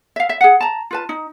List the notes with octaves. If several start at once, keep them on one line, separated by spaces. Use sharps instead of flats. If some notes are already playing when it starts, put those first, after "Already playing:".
E5 F5
E5
G#4 F#5
A5 A#5
F4 B4 A5
D#4